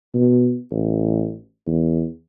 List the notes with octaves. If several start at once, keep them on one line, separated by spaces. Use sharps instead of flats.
B2
A1
E2